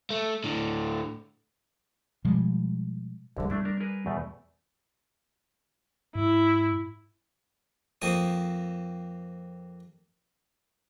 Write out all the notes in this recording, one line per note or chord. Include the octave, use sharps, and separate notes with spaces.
A3
A2 D3
B2 F3 G3 G#3
C2 G2 D3 G#3
G3 A3 D4 E4
D4 A#4
G#4 A#4 B4
E2 B2 A3
G#2 E4
F2 A#3 C4 A5 C#6 D#6